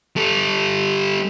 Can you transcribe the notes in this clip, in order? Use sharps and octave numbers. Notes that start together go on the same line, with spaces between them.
G3 A4